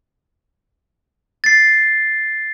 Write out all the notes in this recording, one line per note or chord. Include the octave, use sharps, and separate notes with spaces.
A6 C7